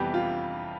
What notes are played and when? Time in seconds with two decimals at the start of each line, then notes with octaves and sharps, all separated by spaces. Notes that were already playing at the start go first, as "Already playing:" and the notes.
Already playing: F2 C3 E3 G3 B3 G4
0.14 F4